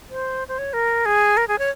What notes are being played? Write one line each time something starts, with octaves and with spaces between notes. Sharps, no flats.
C5
C5
C#5
A#4
G#4
A#4
G#4
C#5